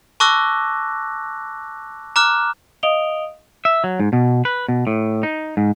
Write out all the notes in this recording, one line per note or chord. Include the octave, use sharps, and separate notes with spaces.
A5 C#6 D6 E6 F#6 A#6
A#5 D6 F6 F#6
D#5 F5 D#6 D7 F7 G7
E5
F#3
G#2
B2
B4
B2
A2
D#4
G#2